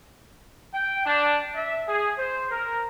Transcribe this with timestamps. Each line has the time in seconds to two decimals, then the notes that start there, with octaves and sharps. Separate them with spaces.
0.74 G5
1.06 D4
1.55 E5
1.87 G#4
2.18 C5
2.51 A#4